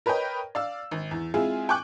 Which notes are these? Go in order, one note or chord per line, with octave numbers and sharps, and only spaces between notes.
A#4 B4 C#5 D#5 G5
D5 F5 E6
G#1
E2
G#3 C4 E4 F4 G#4
G5 G#5 C#6 D6 F#6